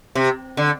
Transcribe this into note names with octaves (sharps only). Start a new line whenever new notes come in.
C3
D3